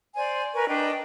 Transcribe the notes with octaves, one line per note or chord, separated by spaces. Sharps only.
C5 D5 G#5
A#4 B4 G#5 C#6
D4 B4 D#5 G5